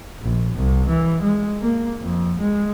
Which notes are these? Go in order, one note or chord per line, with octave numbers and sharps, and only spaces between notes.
A#1
C2
E3
G#3
A#3
F2
G#3